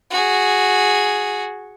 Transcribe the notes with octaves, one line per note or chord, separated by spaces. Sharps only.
F#4 G#4